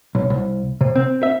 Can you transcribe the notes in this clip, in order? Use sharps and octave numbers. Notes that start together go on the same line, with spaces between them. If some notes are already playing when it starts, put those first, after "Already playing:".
B1
C2
C3
C4
E5